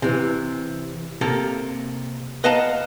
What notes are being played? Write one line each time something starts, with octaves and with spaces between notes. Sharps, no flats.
C3 E3
C3 A#3 A4 A#5
B4 D#5 F5 F#5 A5 A#5